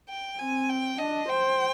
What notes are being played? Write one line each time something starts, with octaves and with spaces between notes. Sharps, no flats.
G5
C4 G#5
G5
D4 D#5
C5 G5